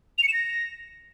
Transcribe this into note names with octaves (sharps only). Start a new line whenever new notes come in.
F7
C#7
E7
A#6